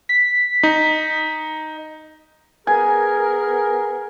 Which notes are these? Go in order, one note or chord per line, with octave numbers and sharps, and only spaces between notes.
B6
D#4
B3 G#4 A#4 G#5